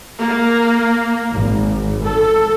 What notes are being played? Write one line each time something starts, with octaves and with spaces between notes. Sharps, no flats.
A#3
G#1
A4